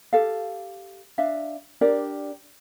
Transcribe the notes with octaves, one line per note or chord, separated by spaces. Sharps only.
G4 A4 F5
D4 E5 F5
D4 G4 A#4 D5